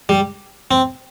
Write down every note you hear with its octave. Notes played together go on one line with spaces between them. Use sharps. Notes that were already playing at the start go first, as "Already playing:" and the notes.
G3
C4